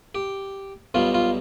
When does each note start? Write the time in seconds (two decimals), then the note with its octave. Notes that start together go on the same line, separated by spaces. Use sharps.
0.15 G4
0.94 B1 B2 G3 F4
1.14 F4